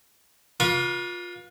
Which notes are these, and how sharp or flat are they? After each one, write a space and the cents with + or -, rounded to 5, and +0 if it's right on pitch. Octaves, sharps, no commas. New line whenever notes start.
F4 +20 B4 -40 D6 -35